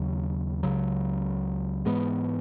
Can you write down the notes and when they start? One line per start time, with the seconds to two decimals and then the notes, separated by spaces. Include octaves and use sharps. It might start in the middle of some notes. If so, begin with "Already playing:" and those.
Already playing: D#2 C#3 F#3
0.63 C#2 C#3 F#3
1.86 G#2 E3 G#3 B3